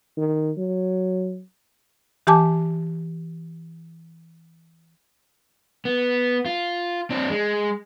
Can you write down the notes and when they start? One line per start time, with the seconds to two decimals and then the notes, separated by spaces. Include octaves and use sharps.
0.17 D#3
0.57 F#3
2.27 E3 G4 G#5 A5 D6
5.85 B3
6.46 F4
7.10 C4 D4
7.30 G#3